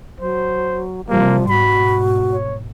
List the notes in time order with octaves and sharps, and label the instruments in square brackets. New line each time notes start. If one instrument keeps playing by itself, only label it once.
[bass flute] F#3 [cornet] C5
[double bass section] C3 E3 G3 [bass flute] F3 [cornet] A#3
[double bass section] G#2 B2 [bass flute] F#4 [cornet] B5
[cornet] C#5